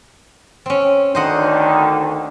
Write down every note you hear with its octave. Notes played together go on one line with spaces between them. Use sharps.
C4 C#4
D2 D3 D#3 C5 D#5 F#5